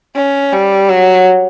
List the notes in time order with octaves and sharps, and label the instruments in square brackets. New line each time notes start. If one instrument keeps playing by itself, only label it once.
[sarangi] C#4
G3
F#3